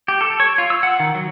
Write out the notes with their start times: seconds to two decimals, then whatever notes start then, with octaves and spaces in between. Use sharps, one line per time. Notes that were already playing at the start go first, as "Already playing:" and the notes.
0.08 G4
0.21 A4
0.40 C#5
0.58 F4
0.70 E6
0.83 F#5
1.00 D#3
1.15 F#3